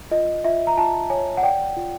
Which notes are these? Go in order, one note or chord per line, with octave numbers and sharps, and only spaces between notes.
F4 D#5
F4 E5
A#5
F4 A5
C#5 G#5
F#5
D5 G5
F4